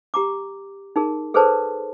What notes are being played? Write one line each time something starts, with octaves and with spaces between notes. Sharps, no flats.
G4 A#5 D6
D#4 G#4 A#4
G#4 A4 B4 C5 D5 A5